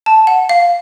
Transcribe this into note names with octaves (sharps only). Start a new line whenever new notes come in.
A5
F#5
F5